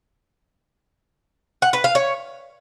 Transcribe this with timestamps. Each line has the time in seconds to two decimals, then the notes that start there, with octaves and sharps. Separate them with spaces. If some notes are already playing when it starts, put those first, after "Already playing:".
1.62 F#5
1.73 B4
1.84 F5
1.95 C#5